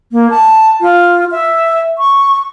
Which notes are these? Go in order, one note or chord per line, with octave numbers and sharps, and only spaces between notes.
A#3
A5
F4
E5
C#6